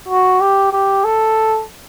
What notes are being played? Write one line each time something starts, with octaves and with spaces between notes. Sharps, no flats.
F#4
G4
G4
A4